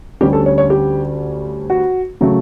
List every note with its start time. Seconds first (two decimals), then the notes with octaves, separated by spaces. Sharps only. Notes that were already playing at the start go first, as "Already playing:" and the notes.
0.21 D2 D3 G3 C#4 G4
0.33 A4
0.46 C#5
0.58 C#5
0.70 G4
1.70 F#4
2.21 C#3 F#3 A3